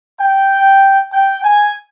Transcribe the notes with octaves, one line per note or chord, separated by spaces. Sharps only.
G5
G5
G#5